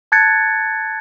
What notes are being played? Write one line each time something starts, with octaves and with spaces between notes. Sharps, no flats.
A5 F#6 G#6 A6 C#7